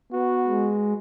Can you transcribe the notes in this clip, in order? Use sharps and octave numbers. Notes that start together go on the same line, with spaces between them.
B3 F#4
G#3